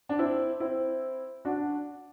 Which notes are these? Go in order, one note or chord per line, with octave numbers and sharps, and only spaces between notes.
D4
C4 E4
C4 E4
D4 F#4